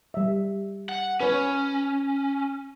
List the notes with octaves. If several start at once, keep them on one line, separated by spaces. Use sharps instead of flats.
G3 E5
F#5
C#4 B4 C#5